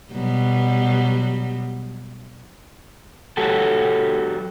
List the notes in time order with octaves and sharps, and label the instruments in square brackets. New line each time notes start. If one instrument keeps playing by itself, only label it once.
[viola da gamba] B2 F#3 G3
[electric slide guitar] F#3 F#4 G4 A4